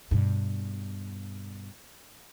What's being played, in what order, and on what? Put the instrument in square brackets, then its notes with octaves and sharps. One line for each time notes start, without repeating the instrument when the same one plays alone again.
[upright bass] G2 B2